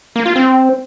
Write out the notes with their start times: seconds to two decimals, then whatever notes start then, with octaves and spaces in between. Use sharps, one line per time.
0.16 A#3
0.26 F4
0.36 C4